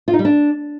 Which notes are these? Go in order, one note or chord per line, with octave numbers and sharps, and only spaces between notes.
F4
D#4
G3
D4